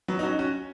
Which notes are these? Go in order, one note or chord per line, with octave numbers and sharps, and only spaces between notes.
F#3 B3
D#4
C#4 F#4
C#4 F#4